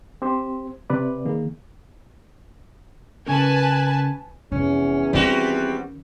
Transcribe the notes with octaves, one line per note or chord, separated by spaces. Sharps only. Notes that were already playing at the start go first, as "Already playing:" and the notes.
C4 G4 C5
C3 B4 D5
D#3 A#3 G#4
C#3 C#4 A#4 B4 G#5 A5
F1 E2 C#4
D#3 G3 C4 C#4 F#4